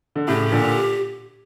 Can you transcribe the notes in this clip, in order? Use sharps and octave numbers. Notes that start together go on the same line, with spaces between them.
D3
A2 C#3 G4
A#2 D3